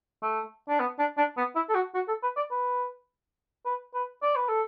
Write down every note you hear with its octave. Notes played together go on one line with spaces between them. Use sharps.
A3
D4
B3
D4
D4
B3
E4
A4
F#4
F#4
A4
B4
D5
B4
B4
B4
D5
B4
A4